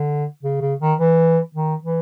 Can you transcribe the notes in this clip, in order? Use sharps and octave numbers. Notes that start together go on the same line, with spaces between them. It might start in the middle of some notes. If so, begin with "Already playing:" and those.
Already playing: D3
C#3
C#3
D#3
E3
D#3
E3